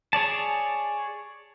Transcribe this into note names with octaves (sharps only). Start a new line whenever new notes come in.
G#4 C#5 D5 A5